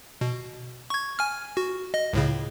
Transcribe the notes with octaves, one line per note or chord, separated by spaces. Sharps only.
B2
C#6 G#6
G#5 F6
F#4
D#5
C#2 A2 C#3